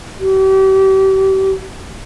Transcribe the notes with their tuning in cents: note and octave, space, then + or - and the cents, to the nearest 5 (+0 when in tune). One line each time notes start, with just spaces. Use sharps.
G4 -35